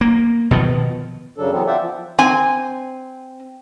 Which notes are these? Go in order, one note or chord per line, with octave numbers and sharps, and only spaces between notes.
A#3
B2 D#3 F3
F#2 C#3 F#3 D4 A4
E3 F#3 B3 C4
F4 D5 E5 F#5 G5
F3
C4 G#5